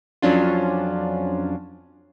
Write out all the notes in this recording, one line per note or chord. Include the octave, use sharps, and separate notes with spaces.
F2 F#3 C#4 D4 F4